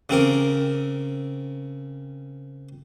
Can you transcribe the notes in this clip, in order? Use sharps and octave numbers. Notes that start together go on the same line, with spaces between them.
C#3 C4 A#4 D6